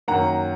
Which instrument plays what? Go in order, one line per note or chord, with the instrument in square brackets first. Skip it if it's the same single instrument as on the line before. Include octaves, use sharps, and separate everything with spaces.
[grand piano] F#2 D#3 A#3 F#5 A#5